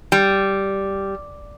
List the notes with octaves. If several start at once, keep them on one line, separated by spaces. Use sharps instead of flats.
G3